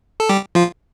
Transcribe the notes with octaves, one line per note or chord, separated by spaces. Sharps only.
A4
G3 G4
F3 F4